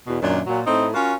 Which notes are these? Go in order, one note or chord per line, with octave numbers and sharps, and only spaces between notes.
E2 B2
F#2 A#2 D#3 D4
A#2 F#3
A2 C4 D#4 D#5
C#4 F4 F#4 A#4